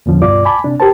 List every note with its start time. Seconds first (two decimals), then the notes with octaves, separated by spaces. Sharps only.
0.06 E2 A#2 D3 F3 C#4
0.21 C#2 G2 B2 F4 D5 D6
0.45 G#5 A5 B5 D6
0.64 C3 D4
0.80 G4 A#4 C5 A5